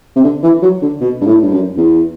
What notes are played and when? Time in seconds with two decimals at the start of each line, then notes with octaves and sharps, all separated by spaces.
0.16 C3
0.24 D3
0.43 E3
0.62 F#3
0.82 D3
1.01 B2
1.21 G2
1.27 A2
1.42 G2
1.52 F#2
1.77 E2